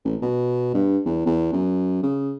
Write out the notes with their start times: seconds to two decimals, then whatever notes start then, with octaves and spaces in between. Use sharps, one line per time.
0.05 A1
0.22 B2
0.74 G2
1.05 E2
1.26 E2
1.53 F#2
2.03 C#3